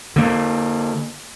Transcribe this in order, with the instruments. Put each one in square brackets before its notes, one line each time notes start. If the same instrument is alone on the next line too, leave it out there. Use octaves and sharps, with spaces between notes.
[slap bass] D3 A#3